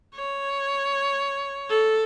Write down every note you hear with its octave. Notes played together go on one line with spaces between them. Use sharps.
C#5
A4